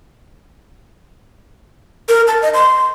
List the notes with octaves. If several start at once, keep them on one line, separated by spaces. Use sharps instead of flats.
A#4
A5
D#5
C6